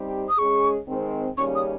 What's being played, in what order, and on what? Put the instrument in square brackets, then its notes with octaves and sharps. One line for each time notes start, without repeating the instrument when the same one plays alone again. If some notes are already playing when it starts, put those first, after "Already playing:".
Already playing: [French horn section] G3 C4 D#4 G4 C5
[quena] D#6
[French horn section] G#3 C#4 G#4 [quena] C#6
[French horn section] D#3 G#3 C4
[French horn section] D#2 C#3 G3 C#4 [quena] C#6
[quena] D#6